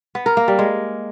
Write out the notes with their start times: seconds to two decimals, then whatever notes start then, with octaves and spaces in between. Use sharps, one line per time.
0.15 B3
0.26 A#4
0.37 A#3
0.48 G3
0.59 G#3